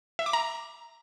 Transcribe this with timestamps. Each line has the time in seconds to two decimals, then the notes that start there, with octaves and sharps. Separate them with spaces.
0.19 E5
0.26 D6
0.33 A#5